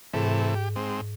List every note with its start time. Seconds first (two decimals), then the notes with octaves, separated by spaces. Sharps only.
0.14 G#2 C3 E3 A3
0.55 G4
0.76 G#2 C4